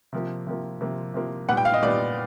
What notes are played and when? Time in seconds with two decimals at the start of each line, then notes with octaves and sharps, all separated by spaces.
0.13 C3 F3 A#3
0.47 C3 F3 A#3
0.81 C3 F3 A#3
1.14 C3 F3 A#3
1.48 A#2 G3 B3 F#5
1.57 G5
1.65 F5
1.74 D#5
1.83 A#2 G3 B3 D5